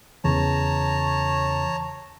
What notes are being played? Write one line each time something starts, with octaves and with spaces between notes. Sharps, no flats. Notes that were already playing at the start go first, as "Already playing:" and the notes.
E2 C#3 E3 C#5 A5 A#5